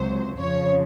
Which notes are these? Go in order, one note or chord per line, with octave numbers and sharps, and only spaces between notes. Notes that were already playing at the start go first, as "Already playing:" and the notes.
Already playing: C#2 C3 F#3 C5
F2 C#3 F3 C#5